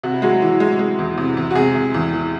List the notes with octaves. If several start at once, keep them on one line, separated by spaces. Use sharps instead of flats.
C3 F#4
E4
F#3 G#3 F#4
E3
G#3
G#3
E2
C3
E2
F#4
C3 G#3 G#4
C3
E2
E3